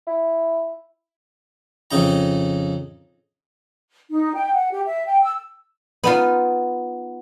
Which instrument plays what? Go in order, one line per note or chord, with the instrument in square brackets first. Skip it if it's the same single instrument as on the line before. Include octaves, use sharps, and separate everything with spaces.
[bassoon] E4
[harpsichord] F2 C#3 D#4 A#5
[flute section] D#4
G5
F#5
G4
E5
G5
E6
[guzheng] B3 D#4 F4